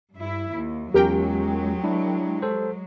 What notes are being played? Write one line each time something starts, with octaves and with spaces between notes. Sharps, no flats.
G2 E4
D#2
E2 F#3 G#3 C#4 F4 G4 A#4 G5
D4 E4
A4 C5